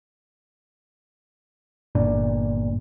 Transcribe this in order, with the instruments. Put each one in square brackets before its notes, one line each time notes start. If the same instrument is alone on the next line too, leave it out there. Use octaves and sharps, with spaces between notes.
[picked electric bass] G1 A#2 D4